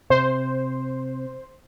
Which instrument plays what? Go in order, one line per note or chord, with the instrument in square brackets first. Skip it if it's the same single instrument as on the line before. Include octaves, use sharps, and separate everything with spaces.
[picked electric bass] C3 [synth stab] C5